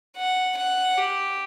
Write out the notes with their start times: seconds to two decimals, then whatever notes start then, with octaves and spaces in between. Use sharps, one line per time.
0.16 F#5
0.57 F#5
0.98 G4